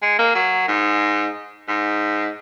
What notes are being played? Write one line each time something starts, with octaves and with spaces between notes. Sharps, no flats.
G#3
A#3
F#3
G#2
G#2